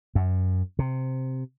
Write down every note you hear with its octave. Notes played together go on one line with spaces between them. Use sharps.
F#2
C3